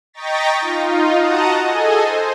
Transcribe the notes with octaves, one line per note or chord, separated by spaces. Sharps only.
D#5 G5 A#5 C#6 A6 B6
D#4 F4
F#4 D#5 F#5 A5 A#5 D#6
G#4 A4 D#5 G#5
C5